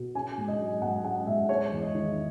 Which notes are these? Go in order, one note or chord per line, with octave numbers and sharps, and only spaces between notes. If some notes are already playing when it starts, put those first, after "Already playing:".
Already playing: B2
C#4 G#5
G#2
D#5
F#3
G#2 F#5
C#4 F#5
G#2 E5
G#3 C#5
E2
D#5
D#3